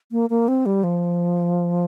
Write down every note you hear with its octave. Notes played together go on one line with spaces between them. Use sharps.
A#3
A#3
C4
G3
F3